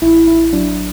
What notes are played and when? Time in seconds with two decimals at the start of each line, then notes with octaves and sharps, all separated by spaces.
0.02 A1 E4
0.27 A1 E4
0.53 F#3 D4